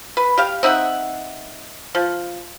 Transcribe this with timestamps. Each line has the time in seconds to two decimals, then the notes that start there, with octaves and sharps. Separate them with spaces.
0.17 B4
0.38 G4 F5
0.63 C4 D#4 E5 F#5
1.95 F3